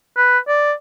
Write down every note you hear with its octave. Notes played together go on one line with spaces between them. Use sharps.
B4
D5